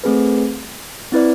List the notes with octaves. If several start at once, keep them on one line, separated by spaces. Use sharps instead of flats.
A3 C4 G#4 B4
C4 E4 B4 D5